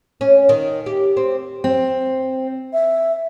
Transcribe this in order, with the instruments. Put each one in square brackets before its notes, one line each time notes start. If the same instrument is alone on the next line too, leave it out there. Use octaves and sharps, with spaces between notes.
[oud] C#4
D#3
G4
C4
[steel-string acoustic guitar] C4
[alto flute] E5